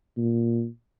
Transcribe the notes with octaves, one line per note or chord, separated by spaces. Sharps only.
A#2